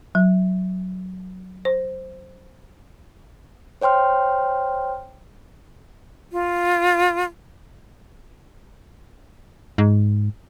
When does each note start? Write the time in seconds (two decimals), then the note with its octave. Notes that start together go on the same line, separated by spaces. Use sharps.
0.15 F#3
1.65 C5
3.81 C5 C#5 G5 C6 F6
6.32 F4
9.78 G#2